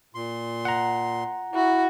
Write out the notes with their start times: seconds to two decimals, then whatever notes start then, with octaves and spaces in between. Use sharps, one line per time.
0.15 A#2 C6
0.65 F#5 A#5
1.54 E4 F#4